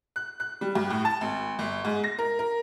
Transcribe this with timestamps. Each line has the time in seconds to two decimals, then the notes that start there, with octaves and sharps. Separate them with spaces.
0.16 F#6
0.40 F#6
0.61 G3
0.75 G2
0.90 A2
1.05 A5
1.21 G#1
1.59 G1
1.85 G#2
2.04 A#6
2.19 A#4
2.39 A#4